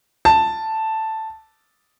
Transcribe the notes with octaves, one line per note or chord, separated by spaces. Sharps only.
A5